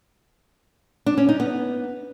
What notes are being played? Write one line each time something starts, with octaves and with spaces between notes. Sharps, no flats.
D4
C#4
D#4
B3